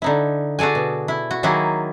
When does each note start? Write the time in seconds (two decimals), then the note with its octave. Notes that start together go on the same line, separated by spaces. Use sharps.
0.02 D3 D#4 E4
0.59 F#4 G#4 A4 D5 G#5
0.75 B2
1.08 E4
1.31 F#4
1.43 D#3 F#3 A#3 E4 F#4 G#4